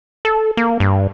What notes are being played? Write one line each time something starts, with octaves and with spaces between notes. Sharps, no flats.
A4
A#3
G2